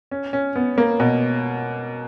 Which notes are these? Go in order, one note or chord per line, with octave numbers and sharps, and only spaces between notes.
C#4
C#4
B3
A#3
B2